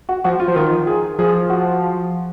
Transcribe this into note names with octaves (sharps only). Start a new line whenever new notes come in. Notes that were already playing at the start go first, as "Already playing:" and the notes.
F#4
F3 F#4
F4
F3
D#3 F4
G#4
F3 G#4
F#4